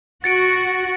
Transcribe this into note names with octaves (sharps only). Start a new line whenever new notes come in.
F#4 A6 C#7 D7